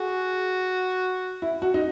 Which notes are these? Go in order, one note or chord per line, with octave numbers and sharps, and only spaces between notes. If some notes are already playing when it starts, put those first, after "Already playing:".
Already playing: F#4 G#4
E4
F#4
D#4